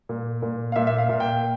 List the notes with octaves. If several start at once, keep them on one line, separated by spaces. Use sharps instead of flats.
A#2
A#2
F5
A#2 E5
E5
F5
A#2
G5